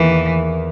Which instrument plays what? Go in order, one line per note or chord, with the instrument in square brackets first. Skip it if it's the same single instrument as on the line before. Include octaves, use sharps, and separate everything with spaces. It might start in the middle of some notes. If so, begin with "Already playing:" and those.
Already playing: [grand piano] E2 D#3 A#3 [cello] E3
[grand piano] E2